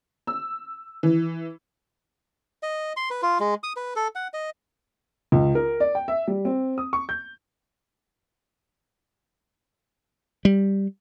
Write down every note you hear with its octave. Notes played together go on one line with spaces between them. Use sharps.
E6
E3
D#5
C6
B4
F4
G#3
D#6
B4
A4
F#5
D#5
C#2
A#4
D5
G5
E5
G3
C4
D#6
C#6
G6
G3